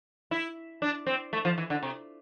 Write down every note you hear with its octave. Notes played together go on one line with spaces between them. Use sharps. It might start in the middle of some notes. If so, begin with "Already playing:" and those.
E4
D4
C4
A3
F3
E3
D3
C3